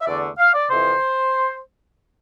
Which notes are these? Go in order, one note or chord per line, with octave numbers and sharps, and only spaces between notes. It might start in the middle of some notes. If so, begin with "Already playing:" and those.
E5
E2 D3 A3 D5
F5
D5
F2 C3 E3 C5